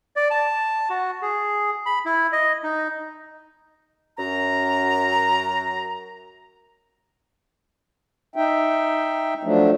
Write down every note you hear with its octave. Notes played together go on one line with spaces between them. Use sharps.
D5
A5
F#4
G#4
B5
E4
D#5
D#4
F#2 A#5
D#4 E5 G5
F3 F#3 A3 D4